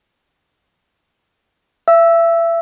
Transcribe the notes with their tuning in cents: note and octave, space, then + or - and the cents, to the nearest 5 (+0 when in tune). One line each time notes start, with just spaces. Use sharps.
E5 +30 E6 +0